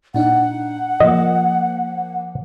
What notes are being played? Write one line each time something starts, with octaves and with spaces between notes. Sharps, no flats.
A#2 D4 D#4 F#5
F3 A#3 D#5